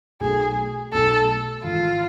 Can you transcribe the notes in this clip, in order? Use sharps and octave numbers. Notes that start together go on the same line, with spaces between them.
B1 B2 A3 G#4
B1 B2 A3 A4
G#1 G#2 E3 F4